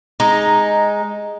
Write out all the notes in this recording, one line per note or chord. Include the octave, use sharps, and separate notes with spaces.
G#3 D#4